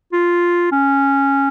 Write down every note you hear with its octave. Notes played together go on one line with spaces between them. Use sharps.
F4
C#4